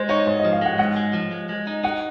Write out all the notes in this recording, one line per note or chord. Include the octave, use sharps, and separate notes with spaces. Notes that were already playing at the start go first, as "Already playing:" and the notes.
Already playing: G#3 C5
D#4 C#5
G#2 C5
D#5
F3
F5
G#3 F#5
G#2 F#5
G#3
F3
G#3
G#3
D#4
D#4 F#5